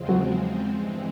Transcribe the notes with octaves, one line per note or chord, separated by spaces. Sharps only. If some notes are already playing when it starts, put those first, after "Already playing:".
Already playing: E2 C#3 F3 G#3 C4
F#3
G2 E3 G#3 C4